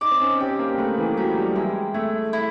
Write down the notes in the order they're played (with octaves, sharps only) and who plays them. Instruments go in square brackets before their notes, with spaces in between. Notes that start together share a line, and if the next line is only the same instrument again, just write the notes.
[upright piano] D#4 [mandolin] D5
[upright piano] C4
C#4
[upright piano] C4 [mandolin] G4
[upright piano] A#3
[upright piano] A3 [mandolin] B4
[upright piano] E3
[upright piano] F#3 [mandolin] G4
[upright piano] G3
[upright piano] G#3 [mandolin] E4
[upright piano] A3 [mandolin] E4
[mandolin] E4